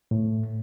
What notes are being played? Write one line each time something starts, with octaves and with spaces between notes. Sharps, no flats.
A2